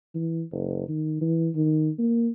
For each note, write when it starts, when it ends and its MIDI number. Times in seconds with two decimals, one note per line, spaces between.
0.15 0.43 52
0.52 0.86 30
0.88 1.18 51
1.21 1.49 52
1.55 1.89 51
1.99 2.30 58